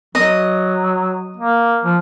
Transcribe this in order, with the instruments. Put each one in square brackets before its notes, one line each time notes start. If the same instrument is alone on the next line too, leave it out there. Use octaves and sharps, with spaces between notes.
[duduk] F#3 [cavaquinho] D#5
[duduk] A#3
F3